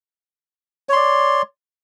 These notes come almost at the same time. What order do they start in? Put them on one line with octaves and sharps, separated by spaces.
C#5 C6 D5